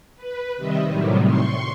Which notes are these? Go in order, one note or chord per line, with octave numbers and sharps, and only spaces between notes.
B4
C3 D#3 G3 D#5 E5
A2 C3 D#3 F#3 G3
C6 C#6